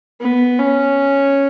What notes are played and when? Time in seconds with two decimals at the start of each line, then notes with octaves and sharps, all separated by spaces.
0.21 B3
0.59 C#4